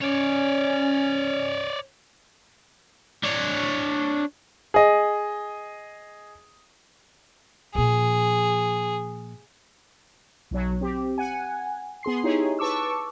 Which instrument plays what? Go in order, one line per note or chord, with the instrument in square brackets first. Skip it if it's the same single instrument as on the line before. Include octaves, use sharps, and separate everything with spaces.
[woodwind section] C#4 [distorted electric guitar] C#5 D5
[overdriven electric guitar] D4 C#5
[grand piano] G#4 D#5
[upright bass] A#2 F3 [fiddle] G#4
[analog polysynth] B1 F#3
C4 G4
F#5 G#5
B3 G#4 C6 C7
D#4 E4 G4 G#4 C#5
B4 A5 C#6 D6 E6